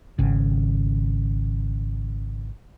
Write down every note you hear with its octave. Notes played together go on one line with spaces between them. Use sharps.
G#1 C#3